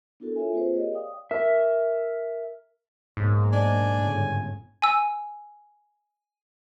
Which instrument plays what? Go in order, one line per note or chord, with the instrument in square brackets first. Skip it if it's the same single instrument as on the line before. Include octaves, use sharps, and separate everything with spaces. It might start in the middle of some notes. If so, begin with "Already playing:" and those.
[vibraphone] B3 D4 E4 F#4 A4 A#4
F4 A4 C#5 E5 G#5
A#3 C4 F4 G#4 B4 C5
G4 G#4 A#4 C#5 D#5
D5 F5 G5 D#6
[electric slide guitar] A#4 E5
[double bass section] B1 A#3 [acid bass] G#2
[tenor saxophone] D4 [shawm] G#5
[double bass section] G1 A2 C#3
[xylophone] G#5 E6